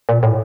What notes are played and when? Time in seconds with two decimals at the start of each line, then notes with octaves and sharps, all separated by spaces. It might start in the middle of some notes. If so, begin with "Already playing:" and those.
0.09 A#2
0.23 A2